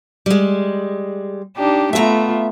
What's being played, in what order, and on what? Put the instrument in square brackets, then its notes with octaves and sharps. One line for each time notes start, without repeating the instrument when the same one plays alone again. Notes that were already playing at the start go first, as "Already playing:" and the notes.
[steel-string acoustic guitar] G3 G#3
[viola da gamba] D4 D#4 G4
[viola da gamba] A3 B3 F4 [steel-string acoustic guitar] E5 F5 A#5